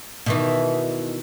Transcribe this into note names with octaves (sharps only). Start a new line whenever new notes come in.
B2 D#3 E3